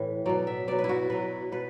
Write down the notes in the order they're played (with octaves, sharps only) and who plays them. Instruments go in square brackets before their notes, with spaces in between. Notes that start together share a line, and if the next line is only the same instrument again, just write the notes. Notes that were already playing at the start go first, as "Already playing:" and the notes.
Already playing: [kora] A2 E3 B4
B2 F#3 D5
E5
B2 F#3 D5
B4
E4
F#4
B2 F#3 B4
B2 B4